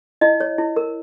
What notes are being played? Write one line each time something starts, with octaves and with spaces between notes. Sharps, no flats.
E4 D#5
C#5
E4
A#4